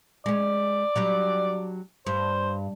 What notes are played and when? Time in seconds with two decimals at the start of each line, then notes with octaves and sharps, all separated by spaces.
0.26 G#3 C#4 D5
0.96 F#3 G3 D4
2.07 G2 C5